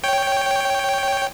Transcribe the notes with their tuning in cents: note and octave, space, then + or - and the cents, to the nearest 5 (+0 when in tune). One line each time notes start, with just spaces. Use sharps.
C#5 +0 G5 +0